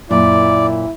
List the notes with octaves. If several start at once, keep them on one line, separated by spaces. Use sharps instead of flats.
F#2 A#2 E4 D5